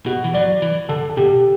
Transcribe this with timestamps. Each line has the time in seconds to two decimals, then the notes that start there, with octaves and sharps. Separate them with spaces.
0.06 B2 F#4
0.24 E3
0.34 F#3 D5
0.62 E3
0.89 D3 A4
1.10 A4
1.17 B2 G4